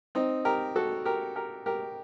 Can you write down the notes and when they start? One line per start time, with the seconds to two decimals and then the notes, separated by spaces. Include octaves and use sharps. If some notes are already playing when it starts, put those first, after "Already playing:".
0.15 C4 D#4
0.45 G4 A#4
0.76 F#4 A4
1.05 G4 A#4
1.36 G4 A#4
1.66 G4 A#4